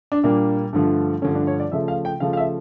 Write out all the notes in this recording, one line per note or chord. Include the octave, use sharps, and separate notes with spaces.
D4
A#2 G3 A#3 D4
G2 D3 F3 A3
G2 D3 F3 A3 C#4
D4
C#5
D5
C#3 F3 A3 E5
F5
G5
C#3 F3 A3 F5
F5
E5